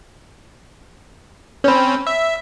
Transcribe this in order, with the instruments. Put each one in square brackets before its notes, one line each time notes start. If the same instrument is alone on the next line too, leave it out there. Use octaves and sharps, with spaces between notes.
[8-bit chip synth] C4 C#4 [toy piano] C#5 B5
[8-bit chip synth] E5